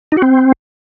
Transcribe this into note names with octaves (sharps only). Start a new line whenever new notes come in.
D#4
F#4
C4